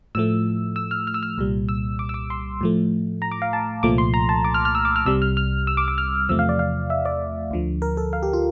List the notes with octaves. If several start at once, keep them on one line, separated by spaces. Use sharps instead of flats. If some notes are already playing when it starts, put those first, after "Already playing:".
A2 F3 A3 E6
E6
F6
F6
E6
F6
C2 A#2 G3
E6
D6
E6
D6
C6
A2 F3 A3
A#5
D6
F5
A5
C2 A#2 F3 A3 D6
C6
A#5
A5
D6
F6
F6
E6
D6
F6
C2 C3 G3 E6
F6
F6
E6
D6
D6
F6
E2 C3 F3 A3 E6
F5
D5
F5
E5
D5
D2 D3 F3
A#4
A4
F5
G4
F4